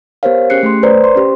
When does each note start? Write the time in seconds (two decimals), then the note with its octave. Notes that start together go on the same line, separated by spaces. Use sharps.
0.23 B3 G4 A#4 C5 C#5 F5
0.50 C#4 G4 G#4 F#6 C7 C#7
0.63 A3 C6
0.83 B4 C5 D5 A#5
1.04 C6
1.16 C#4 G4 C5